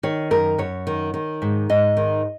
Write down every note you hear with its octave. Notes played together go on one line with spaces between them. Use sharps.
D#3 C#5
F#2 A#4
F#2 C#5
D#3
D#3
G#2
G#2 D#5
D#3